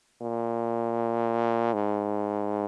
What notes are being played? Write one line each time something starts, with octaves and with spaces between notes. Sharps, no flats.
A#2
G#2